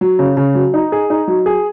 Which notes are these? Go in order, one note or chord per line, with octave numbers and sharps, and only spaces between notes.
F#3
C#3
C#3
F#3
D#4
G#4
D#4
F#3
G#4